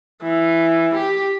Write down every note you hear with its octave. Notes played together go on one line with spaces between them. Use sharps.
E3
G4